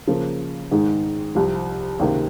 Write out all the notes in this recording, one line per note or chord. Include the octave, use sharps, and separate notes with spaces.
C#3 F3 A#3
G#2 D#3 G#3 D#4
C2 C3 F3
C#2 C3 D#3 A#3